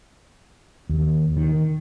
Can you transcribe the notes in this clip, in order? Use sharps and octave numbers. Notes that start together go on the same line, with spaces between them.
D#2
D#3